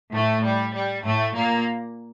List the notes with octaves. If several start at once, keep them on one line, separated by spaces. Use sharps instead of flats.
A2 A3
G3
G3
A2 A3
A#2 A#3